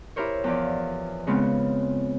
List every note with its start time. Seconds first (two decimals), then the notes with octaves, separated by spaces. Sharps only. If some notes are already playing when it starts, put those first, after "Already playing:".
0.16 E4 G4 A#4 C5 C#5
0.44 E2 F3 D5
1.27 C#3 G#3 B3 C4 F4